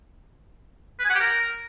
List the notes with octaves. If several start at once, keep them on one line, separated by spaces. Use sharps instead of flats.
B4
G#5
F#5
G4
A#4